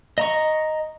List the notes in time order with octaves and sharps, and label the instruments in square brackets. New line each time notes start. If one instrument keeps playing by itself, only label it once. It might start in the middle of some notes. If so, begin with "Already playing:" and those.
[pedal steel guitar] D#5 A#5 C#6